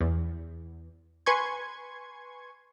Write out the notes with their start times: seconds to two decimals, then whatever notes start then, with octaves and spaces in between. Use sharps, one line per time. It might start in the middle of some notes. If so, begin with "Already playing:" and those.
0.01 E2
1.26 B4 G#5 C6 C#6 G#6